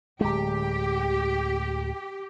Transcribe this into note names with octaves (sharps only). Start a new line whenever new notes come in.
D1 G#3 G4